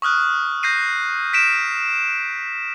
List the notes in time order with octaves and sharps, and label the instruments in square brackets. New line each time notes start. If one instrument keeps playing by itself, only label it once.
[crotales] C#6 D#6 F6 F#6
G6 A#6 C7 D#7
B6 D7 E7